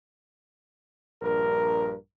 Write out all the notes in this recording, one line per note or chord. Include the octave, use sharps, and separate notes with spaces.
A#1 G2 A#4